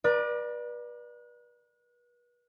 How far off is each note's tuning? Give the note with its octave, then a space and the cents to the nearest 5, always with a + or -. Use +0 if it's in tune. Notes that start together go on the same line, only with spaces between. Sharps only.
B4 -35 D5 +20 A#5 +5